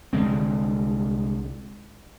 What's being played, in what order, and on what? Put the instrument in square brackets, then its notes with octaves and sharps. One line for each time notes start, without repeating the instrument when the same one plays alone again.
[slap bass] C2 D3 G#3 C4